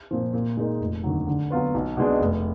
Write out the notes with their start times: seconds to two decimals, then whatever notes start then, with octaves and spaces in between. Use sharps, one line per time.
0.11 A#2 F3
0.33 A#2
0.57 G#3 D#4 A#4
0.80 F1
1.04 D#2 D3 F#3
1.27 D3
1.50 F#3 B3 F4 B4
1.74 B1
1.97 B2 G#3 D4
2.21 F1